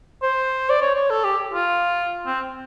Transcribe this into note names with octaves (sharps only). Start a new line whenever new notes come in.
C5
D5
C#5
C#5
A4
G4
F4
C4